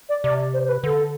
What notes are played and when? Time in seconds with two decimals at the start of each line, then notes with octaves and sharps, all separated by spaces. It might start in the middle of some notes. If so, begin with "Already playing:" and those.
0.09 D5
0.24 C3 D5
0.54 C5
0.64 C5
0.69 B4
0.84 D3 A4